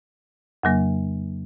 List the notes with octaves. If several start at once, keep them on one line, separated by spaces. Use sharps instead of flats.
F2 C#3 F#3 A#3